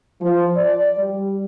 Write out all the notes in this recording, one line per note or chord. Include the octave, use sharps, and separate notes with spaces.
F3
D5
G3